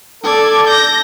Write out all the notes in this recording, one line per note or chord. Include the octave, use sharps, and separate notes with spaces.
A4 D5 G#6
G6 A#6